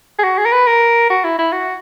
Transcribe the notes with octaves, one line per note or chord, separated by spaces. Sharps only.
G#4
F#4
G#4
A#4
B4
A#4
F#4
E4
E4
F#4